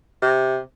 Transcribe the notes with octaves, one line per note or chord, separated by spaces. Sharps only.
C3